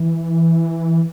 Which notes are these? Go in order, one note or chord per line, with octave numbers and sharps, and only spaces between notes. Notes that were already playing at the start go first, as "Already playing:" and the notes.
Already playing: E3